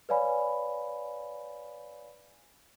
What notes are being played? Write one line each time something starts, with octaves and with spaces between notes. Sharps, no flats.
B4 C#5 D5 F5 G#5 B5